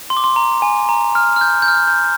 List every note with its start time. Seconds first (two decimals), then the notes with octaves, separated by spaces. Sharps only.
0.10 C6
0.17 D6
0.24 C6
0.36 A#5
0.62 G#5
0.89 A#5
1.15 F6
1.36 F6
1.41 G6
1.62 G6
1.68 F6
1.87 G6